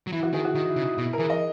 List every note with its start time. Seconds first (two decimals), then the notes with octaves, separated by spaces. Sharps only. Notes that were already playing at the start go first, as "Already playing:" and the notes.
0.07 F#3
0.12 E3 E4
0.23 F#4
0.33 D#3 G#4
0.45 F#4
0.55 D#3 D#4
0.69 E4
0.76 C#3
0.83 D#4
0.97 B2 E4
1.13 A#4
1.19 E3 G#4
1.30 D#5